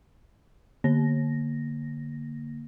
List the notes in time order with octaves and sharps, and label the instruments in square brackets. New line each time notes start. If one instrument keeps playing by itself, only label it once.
[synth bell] D3 A#3 A#6